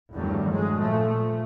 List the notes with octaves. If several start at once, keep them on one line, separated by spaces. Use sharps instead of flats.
E2 G2 D#3 F#3 G3 A3
F2 F#3 G#3
A#2 F3 A3